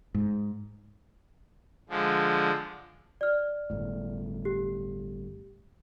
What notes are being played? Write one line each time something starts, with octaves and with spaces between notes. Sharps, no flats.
G#2
D3 F3 G#3
D5 F6
G1 A2
G4